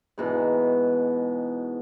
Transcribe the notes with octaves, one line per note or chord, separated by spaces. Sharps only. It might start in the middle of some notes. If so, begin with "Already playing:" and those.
G#2 B2 E3 F#5